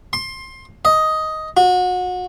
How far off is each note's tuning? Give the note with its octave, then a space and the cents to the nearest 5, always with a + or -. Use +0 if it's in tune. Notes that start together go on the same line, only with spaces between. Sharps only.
C6 +20
D#5 +10
F#4 -30